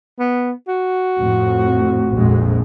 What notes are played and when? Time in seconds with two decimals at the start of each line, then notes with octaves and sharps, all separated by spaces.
0.19 B3
0.68 F#4
1.20 F2 A2
2.18 A#1 F2 G#3